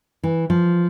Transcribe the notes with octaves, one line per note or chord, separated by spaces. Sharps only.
E3
F3